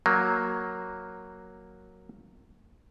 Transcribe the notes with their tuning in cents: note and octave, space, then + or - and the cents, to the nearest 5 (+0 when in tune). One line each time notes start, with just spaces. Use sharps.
F#3 +0 A#3 +0